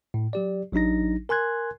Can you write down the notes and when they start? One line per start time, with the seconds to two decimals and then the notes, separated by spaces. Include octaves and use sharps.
0.14 A2
0.33 F#3 G4 D5
0.72 A1 F#3 D4 D#4 A#6
1.29 A#4 G#5 C6 F#6 G#6